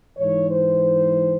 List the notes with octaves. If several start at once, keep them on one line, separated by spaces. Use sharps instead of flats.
G#2 E3 C#5
C5